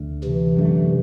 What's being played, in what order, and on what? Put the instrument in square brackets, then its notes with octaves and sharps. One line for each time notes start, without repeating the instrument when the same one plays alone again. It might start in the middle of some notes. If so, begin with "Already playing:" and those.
Already playing: [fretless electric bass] D2 D3 A3
[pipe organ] C3 E3
[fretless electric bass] F#2 D3 A3